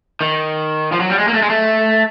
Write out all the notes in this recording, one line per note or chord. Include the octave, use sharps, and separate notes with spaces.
D#3
F3
F#3
G3
G#3
A#3
A3
G#3
A3